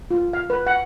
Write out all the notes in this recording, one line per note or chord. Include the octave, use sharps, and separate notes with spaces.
F4
F5
B4
F#5